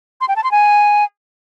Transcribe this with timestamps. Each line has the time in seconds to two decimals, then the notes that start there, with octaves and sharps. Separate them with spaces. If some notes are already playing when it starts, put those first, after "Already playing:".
0.21 C6
0.28 G5
0.36 A5
0.44 C6
0.51 G#5